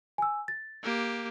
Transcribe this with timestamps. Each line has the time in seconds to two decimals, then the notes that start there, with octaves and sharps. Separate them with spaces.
0.18 G#5 E6
0.48 A6
0.83 A#3 G4